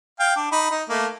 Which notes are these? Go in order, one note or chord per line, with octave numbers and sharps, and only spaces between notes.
F5 G5
D4
D#4 B5
D#4
A3 A#3